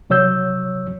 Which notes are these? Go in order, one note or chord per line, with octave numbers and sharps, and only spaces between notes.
C3 F#3 C#5 E6 G6